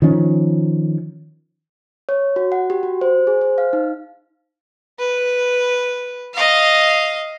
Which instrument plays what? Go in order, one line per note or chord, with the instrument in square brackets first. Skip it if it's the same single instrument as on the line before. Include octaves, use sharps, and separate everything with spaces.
[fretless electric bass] D#3 F3 C#4
[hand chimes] C#5
F#4
F#5
G4
F#4
C5
G#4
C5
F5
D#4
[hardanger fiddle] B4
D#5 F5